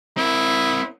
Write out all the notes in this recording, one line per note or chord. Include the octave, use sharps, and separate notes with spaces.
C4 E4 A#4